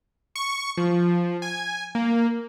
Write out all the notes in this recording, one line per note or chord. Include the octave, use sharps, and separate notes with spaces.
C#6
F3
G#5
A#3